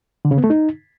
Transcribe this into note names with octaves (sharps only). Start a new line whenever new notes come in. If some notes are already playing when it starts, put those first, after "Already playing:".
D3
C#3
B3
A3
D#4